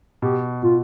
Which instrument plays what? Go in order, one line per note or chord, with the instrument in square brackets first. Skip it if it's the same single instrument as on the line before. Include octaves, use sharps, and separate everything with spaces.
[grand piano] B2 [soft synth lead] G4
[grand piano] B2 [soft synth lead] F4